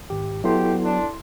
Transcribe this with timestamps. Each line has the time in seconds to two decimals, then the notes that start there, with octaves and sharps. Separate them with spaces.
0.10 G#1 G4
0.44 F#3 B3 E4 G4 A4 C6
0.84 D4